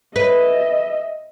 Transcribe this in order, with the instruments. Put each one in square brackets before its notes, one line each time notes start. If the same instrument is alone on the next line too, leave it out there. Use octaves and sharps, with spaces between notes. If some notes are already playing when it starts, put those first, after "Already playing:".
[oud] B4 [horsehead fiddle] D#5 E5